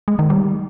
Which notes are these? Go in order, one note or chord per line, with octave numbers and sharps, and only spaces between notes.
G#3
D#3
G3